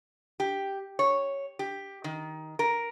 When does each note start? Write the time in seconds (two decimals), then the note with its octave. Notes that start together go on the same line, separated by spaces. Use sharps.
0.40 G4
0.99 C#5
1.59 G4
2.04 D#3
2.59 A#4